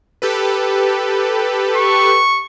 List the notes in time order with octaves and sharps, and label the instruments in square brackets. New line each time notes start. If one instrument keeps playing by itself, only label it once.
[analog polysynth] G4 A4 B4
[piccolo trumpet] C#6